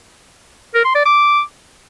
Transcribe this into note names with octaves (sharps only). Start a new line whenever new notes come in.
A#4
C6
D5
D6